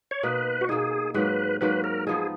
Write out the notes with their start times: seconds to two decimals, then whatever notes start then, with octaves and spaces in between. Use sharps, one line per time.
0.11 C#5
0.23 B2 A#3 D#4 B4
0.61 F#4
0.69 B2 A#3 D#4 G#4
1.14 G#2 F#3 A#3 B4
1.61 G#2 F#3 A#3 B4
1.84 A#4
2.07 F3 B3 D#4 G#4